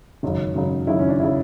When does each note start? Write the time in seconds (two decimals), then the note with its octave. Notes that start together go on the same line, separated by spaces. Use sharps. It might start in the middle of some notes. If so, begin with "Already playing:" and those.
0.23 G#1 F#2 C#3
0.55 G#1 F#2 C#3
0.87 G#1 F#2 C#3 E4
0.99 C#4
1.09 D4
1.20 C#3 E4